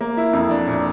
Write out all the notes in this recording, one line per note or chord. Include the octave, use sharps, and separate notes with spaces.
A#3
E4
F2
D4
A#2